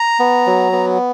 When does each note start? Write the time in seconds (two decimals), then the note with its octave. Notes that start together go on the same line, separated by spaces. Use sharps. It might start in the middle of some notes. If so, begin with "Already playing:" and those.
Already playing: A#5
0.19 B3
0.46 F#3
0.72 B3